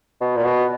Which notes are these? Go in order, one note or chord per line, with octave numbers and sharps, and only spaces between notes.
B2
A#2
B2